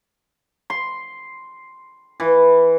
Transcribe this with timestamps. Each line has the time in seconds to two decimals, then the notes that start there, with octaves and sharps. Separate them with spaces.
0.70 C6
2.20 E3